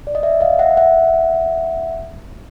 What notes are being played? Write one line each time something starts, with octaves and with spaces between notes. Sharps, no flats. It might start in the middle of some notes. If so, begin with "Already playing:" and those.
D5
D#5
D5 E5
D#5 F5
E5 F#5
E5 F#5